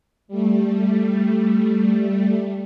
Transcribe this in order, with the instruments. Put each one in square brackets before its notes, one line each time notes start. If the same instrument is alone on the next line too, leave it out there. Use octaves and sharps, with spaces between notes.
[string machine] G3 A3